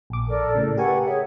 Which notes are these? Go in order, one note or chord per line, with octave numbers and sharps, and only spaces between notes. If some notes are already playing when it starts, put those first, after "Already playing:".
A#1 D6
A4 A#4 D5
A2 C#3
G4 A#4 B4 F#5 G#5 C#6
G#4 C#5 E5